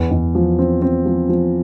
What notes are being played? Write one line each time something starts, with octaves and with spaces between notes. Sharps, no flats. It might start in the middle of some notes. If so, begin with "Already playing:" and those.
Already playing: E2
E2
F3
C4
C4
F3
F3